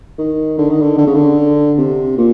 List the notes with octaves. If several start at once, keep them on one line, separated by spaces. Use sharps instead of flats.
D#3
D3
D#3
D3
D3
C#3
D3
C3
A#2